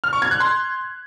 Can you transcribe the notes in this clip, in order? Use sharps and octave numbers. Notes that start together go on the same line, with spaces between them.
F6
C#6
G#6
F#6
C6